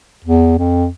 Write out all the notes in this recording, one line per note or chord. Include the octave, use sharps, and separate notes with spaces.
E2
F2